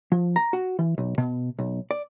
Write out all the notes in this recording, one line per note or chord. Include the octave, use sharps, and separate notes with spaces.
F3
A#5
F#4
E3
B1
B2
B1
D5